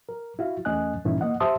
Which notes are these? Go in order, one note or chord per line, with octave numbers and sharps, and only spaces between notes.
A#4
E4 F#4 F5
E2 A3 C#4 D#5 G#5 F#6
G2 A#2 D#3 E3 C#4 E4
A#3 D#5 F#5
G4 C5 E5 A5 C6 D#6